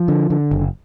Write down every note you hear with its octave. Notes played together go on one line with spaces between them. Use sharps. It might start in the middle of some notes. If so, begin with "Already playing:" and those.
Already playing: F3
D3
D3
F#1